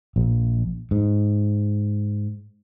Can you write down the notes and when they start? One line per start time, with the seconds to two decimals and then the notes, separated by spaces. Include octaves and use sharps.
0.16 A#1
0.91 G#2